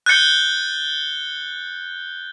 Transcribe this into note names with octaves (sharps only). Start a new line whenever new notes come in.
F#6 G6 A6 C#7 G7